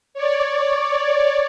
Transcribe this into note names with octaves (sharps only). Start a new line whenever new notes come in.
C#5 D5